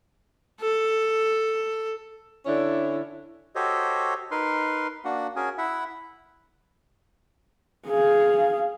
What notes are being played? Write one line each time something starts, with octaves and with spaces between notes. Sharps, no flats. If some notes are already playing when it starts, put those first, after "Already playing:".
A4
D3 C#4 D4 E4
F#4 G4 A4 C5 C#5 D#5
D#4 A#4 B4 C6
A#3 D4 F#4 F#5
C#4 F#4 G#4 A#4 G#5
E4 E5 F#5
G#4 F5